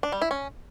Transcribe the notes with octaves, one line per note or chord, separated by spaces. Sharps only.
D4
G3
E4
C#4